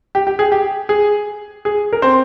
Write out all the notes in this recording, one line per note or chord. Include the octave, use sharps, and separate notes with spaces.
G4
G4
G#4
G4
G#4
G#4
A#4
C4 C5